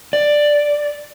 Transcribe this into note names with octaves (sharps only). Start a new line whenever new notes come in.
D5